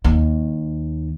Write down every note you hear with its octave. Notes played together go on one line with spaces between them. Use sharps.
D#2